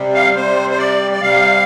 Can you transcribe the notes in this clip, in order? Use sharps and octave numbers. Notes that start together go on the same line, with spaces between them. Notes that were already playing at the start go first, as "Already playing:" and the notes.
Already playing: C3 G3
F5
C3 G3 C5
C5
D5
D5
C3 G3 F5